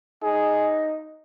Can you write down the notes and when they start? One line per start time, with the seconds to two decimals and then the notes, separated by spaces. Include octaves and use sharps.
0.23 D#4 G#4